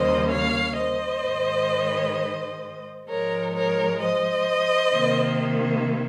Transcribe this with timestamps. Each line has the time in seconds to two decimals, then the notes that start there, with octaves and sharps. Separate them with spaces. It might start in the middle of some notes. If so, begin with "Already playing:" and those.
Already playing: D#2 C#3 G3 A#3 C5 D#5
0.31 C#5 F5
0.77 C5 D#5
1.23 G#2 D#3 G#3
3.08 G#2 F3 G#3 A#4 C#5
3.55 A#4 C#5
4.01 C5 D#5
4.94 C3 D#3 A#3